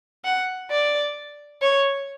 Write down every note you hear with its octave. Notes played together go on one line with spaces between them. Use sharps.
F#5
D5
C#5